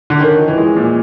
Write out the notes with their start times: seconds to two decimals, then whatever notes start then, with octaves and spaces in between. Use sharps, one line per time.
0.10 D3
0.20 D#3 C#4
0.39 F3
0.48 E3
0.58 G#3
0.76 A#2